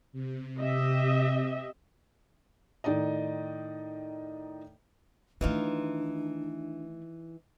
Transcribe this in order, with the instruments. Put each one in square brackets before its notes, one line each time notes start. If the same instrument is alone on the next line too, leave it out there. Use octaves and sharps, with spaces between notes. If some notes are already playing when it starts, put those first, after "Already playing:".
[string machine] C3
[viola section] G4 D#5 E5
[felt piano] A2 D#3 D#4 D5 D#5
[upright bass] D#3 A3 [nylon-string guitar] E3 D#4 F4 [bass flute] D4